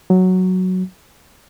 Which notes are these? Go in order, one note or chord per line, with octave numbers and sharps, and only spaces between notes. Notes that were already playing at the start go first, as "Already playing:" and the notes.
F#3